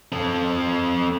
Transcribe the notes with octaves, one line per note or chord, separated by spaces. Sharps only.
C4 A4